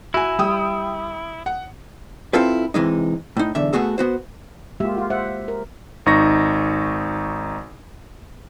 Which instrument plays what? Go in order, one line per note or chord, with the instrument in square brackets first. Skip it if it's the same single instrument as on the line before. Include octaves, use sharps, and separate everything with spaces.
[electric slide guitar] E4 [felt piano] F#4 G#5
[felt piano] G3 G5 D#6
F#5
[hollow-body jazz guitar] C4 E4 F4 A4 B4
C3 E3 G#3 D#4
A2 D#4
B1 E2 D3 E5
A3 B3 F#4 G#4 A4
B3 F#4 C5
[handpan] G#3 A#3 G4 [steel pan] F4 E5
[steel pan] F4 F#4
[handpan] C5 E5 [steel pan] F#5
[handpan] A#4
[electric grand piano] G#1 D#4 C#6 A#6